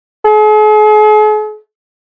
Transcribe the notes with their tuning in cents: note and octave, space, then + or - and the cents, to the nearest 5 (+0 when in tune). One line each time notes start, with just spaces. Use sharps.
G#4 +45